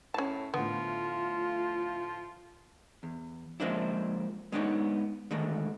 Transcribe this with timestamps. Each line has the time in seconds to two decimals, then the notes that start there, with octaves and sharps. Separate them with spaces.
0.14 A2 C#4 A5
0.54 A2 D3 F3 B3 F4
3.03 E2
3.60 F3 G#3 A#3 C4 D4 E4
4.52 G#3 B3 D4 D#4 C#5
5.31 D3 D#3 G#3 A3